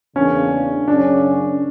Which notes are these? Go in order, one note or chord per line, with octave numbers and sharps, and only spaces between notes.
E2 C#3 E3 A#3 C#4 D4
F#2 C#3 F#3 C#4 D4